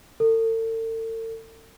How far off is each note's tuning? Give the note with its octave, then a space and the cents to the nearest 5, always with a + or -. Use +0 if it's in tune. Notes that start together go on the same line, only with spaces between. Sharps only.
A4 +40